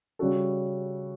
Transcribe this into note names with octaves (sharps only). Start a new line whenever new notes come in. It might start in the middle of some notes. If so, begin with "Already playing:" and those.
C#3 G3 C#4 F#4 A4